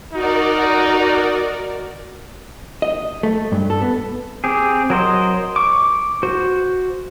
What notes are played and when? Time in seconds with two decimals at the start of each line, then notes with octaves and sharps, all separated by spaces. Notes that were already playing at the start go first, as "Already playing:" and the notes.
0.13 D#4 F#4 A#4 D5
2.82 D#5
3.23 A3
3.52 G2
3.70 A4
3.82 B3
4.44 C4 G4 G#4
4.90 F#3 A#4 C5 D#5
5.56 C#6 D6
6.23 F#4 C5